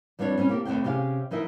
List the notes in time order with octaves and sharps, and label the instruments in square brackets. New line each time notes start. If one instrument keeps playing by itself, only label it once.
[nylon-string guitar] F2 G3 B3 D4 E4 C#5
G3 C4 C#4
A#3 G4 A4
D#2 G#2 B2 A3 C4 G5
C3 C4 C#4 G4 G#4 F5
E3 F3 D#4 A#4 E5